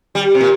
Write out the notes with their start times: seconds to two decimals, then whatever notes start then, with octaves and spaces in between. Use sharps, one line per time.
0.15 G3
0.35 C3
0.41 A#2